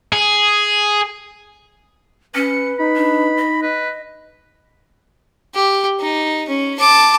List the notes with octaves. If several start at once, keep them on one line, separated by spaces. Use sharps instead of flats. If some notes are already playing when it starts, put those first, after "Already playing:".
G#4
C#4 B4 C#7
D#4 B5
D4
D#5
B4
G4
D#4
C#4
A5 D6